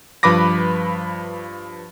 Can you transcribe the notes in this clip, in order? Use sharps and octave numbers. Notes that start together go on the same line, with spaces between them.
G2 F3 B4 B5 D6 A#6